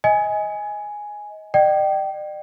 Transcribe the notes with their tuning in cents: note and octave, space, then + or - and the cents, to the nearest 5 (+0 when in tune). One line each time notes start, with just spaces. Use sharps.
D#5 +25 G#5 +0
D5 +45 G5 -25